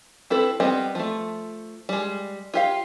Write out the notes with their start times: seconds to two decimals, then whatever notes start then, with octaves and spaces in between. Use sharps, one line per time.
0.30 C4 E4 A4 B4
0.60 G3 B3 C4 D#5
0.95 F3 A3
1.89 G3 G#3
2.54 F4 G4 F5